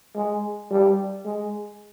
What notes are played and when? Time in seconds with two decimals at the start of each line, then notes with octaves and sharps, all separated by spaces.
0.15 G#3
0.71 G3
1.25 G#3